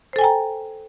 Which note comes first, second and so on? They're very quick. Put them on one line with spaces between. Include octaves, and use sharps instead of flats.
C5 A4 G#5 G5 A#5